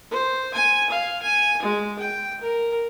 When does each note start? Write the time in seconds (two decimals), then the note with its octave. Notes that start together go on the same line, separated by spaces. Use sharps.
0.11 C5
0.54 G#5
0.90 F5
1.22 G#5
1.62 G#3
1.99 G5
2.41 A#4